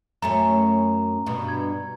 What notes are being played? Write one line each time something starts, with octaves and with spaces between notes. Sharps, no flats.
F#2 A3 C#4 A#5
G2 B2
G#6